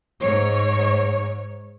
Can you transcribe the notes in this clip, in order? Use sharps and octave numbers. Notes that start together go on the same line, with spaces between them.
G#2 C#5